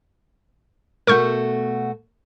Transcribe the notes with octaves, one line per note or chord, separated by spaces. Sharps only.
B2 A3 F#4 A#4 C#6 G6